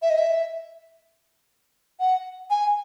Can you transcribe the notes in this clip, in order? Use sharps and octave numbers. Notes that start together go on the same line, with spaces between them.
E5
D#5
E5
F#5
G#5